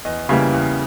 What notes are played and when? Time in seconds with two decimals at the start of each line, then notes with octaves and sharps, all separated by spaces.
0.05 E2 D#5
0.29 C#3 E3 G3 A#3
0.53 E2